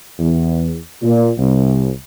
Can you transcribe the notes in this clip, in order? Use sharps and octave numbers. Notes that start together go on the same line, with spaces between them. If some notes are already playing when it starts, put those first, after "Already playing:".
E2
A#2
C2